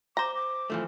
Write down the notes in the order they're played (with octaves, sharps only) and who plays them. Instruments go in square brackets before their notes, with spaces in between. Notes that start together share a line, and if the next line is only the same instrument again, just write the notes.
[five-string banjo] C5 A#5 [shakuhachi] D6
[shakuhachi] D6
[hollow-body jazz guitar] E3 F3 A3